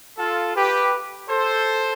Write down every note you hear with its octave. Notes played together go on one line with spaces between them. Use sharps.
F4 A4
G4 B4
A4 C5